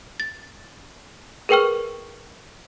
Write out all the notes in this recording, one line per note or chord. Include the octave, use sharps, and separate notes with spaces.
A6
G#4 A#4 B4 G5 C#6 F6